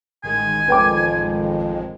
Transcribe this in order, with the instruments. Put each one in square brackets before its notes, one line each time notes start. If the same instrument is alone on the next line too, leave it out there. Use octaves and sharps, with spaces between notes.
[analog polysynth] A1 D#3 G#3 [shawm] G#5
[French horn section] F2 [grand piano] B4 G5 D6